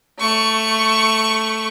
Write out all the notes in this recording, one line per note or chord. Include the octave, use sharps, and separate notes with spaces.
A3 C#6